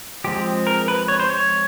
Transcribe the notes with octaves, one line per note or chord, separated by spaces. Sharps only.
F3 G#3 C4 G4
A#4
B4
C#5
C5
C#5